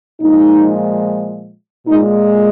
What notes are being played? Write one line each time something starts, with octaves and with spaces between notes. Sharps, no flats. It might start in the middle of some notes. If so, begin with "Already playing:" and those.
A#2 F3 G#3 D#4
A#2 G#3 D#4